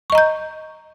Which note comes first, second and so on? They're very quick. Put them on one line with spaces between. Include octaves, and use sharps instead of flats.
C#6 D#5 A#5 G6